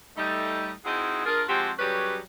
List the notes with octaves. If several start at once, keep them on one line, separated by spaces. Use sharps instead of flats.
G3 A3 D#4
C4 D#4 E4 F#4 G#4
D4 F4 G#4 A#4
F3 G#3 C4 F#4 G4
F#3 G3 C#4 G4 G#4 B4